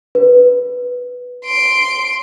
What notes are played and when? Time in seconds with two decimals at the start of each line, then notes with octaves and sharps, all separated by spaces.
0.15 B4
1.45 C6 D7